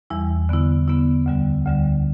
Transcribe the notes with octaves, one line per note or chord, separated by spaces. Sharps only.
E2 E3 G3 E4
D3 B3 E4
D3 B3 E4
D2 D3 G3
D2 D3 G3